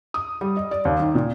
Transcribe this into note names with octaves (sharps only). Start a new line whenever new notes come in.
D#6
G3
D#5
D5
D#2
D#3
A#2